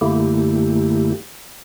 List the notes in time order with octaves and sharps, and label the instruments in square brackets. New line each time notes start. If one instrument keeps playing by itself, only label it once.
[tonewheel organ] F#2 D3 A3 A#3 E4 G4